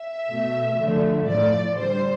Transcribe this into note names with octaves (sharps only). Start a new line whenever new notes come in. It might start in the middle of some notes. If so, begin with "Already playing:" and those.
Already playing: E5
B2 A3
D3 F3 A3
A2 F3 A3 D5
D3 G3 C5